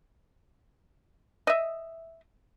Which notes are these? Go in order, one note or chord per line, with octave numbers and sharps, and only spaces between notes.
D#5 E5